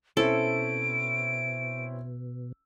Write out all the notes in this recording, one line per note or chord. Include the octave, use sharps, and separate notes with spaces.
B2 C4 C#4 E4 A4 D7